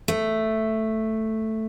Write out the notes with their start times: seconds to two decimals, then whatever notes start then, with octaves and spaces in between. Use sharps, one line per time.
0.08 A3